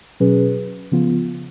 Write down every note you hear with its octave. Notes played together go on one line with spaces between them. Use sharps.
B2 F#3 C#4 G#4 B4
C#3 F3 B3 F4